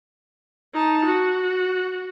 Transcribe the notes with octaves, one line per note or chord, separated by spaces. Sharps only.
D#4 A5
F#4